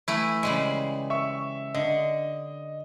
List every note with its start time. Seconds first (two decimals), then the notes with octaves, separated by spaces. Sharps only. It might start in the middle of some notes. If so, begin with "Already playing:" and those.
0.08 E3 A3 E4
0.43 C#3 G3 G#3
1.10 E5 C#6
1.75 D3 D#5